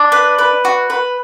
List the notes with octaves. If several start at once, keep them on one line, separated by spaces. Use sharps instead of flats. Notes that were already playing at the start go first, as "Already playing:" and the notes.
Already playing: D4
B4
B4
F#4
B4